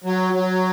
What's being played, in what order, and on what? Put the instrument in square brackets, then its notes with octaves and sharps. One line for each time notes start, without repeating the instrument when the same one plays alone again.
[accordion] F#3
F#3